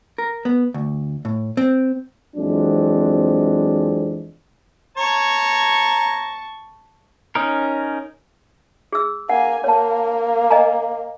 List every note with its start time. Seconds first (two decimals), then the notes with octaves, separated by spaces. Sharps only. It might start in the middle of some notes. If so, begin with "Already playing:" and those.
0.18 A#4
0.45 B3
0.74 D2
1.25 A2
1.57 C4
2.36 F2 E3 F#3 G#3 C4 D4
4.97 C#5 A5 A#5 C#6
7.35 C#4 D#4 A#4
8.93 G#4 E6
9.29 A#3 F#5 G#5
9.64 A#3 C#5 A5
10.50 D#5 G#5 A#5